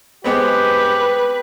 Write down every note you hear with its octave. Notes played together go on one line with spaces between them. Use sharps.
G#3 B3 C4 G4 B4